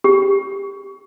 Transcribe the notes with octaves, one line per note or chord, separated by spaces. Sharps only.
G4